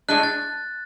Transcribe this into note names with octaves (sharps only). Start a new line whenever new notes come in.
A2 G#3 D4 F#6
A6